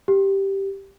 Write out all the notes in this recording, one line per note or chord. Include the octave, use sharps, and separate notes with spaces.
G4